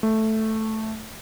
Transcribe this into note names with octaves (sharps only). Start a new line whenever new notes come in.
A3